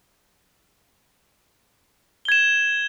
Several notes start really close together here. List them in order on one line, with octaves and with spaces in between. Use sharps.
G7 G#6 E7